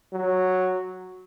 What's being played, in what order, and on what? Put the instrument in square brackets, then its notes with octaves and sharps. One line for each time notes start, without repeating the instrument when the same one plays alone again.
[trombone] F#3